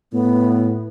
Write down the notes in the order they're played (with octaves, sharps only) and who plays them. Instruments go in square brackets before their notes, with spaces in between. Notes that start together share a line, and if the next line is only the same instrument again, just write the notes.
[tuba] A2 [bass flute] B3